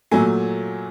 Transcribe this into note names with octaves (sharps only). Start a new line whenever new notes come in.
A#2 F#3 A3 G#5